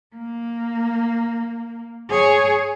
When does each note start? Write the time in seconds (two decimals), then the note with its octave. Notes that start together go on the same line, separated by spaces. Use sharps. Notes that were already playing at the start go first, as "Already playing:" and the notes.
0.16 A#3
2.09 G#4 C#5